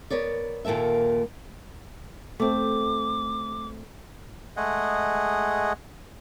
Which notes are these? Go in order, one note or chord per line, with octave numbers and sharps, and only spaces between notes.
B3 A#4 C#5 D5
D#2 A#2 A#3 A4 E5
A3 C4 D6
G#3 A3 G#4 D#5 F#5